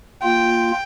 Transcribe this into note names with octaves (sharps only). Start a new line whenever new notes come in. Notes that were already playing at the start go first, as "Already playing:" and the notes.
A#3 F4 G5